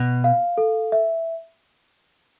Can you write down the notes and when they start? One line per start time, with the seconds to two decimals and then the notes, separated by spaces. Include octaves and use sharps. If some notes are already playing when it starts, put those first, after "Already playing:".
Already playing: B2
0.24 F5
0.58 A4
0.92 E5